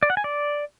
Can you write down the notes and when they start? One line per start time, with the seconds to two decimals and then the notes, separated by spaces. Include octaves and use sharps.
0.03 D5
0.10 F#5
0.17 G#5
0.24 D5